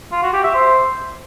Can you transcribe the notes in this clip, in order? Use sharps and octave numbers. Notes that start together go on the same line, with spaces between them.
F4
F#4
G4
E5
C5